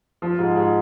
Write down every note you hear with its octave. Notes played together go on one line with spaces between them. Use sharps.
F3
G#2
G#2